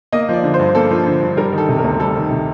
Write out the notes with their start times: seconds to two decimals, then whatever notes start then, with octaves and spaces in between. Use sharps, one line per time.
0.13 A#3 D#5
0.29 F3 D5
0.44 D3
0.54 C5
0.60 G2
0.75 A#3 A4
0.91 F3
1.06 D3
1.22 G2
1.37 G3 A#4
1.53 D#3
1.58 A4
1.69 C3
1.79 A#4
1.84 D2
2.00 G3 A4
2.16 D#3
2.31 C3